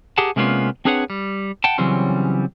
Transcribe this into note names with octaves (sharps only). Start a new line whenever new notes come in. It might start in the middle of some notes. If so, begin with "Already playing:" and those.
G4 G#4 A#4 F#5 A5
C3 G#3 A#3 B3 C#4 F4
C4 D4 G#4 B4 C#5 F#5
G3
F#5 G5 A5
C#3 E3 F#3 G3 C4 C#4